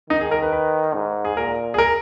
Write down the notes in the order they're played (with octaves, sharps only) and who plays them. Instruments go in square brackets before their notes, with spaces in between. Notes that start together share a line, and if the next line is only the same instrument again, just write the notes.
[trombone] D#3 [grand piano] D#4
[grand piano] G#4
A#4
B4
B4
[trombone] G#2
[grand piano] G#4
[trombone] A#2 [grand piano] A#4
[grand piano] G#4
A#4